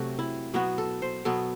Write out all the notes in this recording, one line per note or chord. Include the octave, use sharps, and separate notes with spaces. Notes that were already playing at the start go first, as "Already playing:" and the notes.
Already playing: C3 F#3 A3 C4 F#4
E4
B2 F#3 B3 F#4
A4
C5
B2 F#3 B3 A4